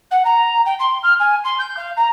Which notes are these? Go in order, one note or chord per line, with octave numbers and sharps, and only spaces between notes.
F#5
A#5
G5
C6
F6
G#5
C6
G6
F5
A#5